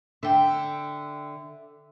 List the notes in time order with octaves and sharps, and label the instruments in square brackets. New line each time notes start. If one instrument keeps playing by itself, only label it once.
[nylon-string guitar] D3 [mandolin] E5 G5